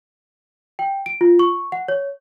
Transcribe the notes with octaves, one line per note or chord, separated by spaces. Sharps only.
G5
D7
F4
C#6
F#5
C#5